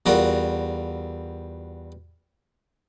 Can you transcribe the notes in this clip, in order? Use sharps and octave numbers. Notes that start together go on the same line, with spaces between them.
E2 G3 F4 F#4 A#4